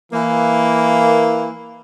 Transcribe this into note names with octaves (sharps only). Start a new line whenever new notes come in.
E3 A#3